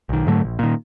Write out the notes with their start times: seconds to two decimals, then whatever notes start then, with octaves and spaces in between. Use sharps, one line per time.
0.09 B1 D#3
0.27 G#2 D3 F#3 A3
0.44 A#1
0.59 A#2 D#3